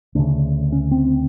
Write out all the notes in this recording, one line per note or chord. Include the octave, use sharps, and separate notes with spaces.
D2 C#3 D4
C#4
C4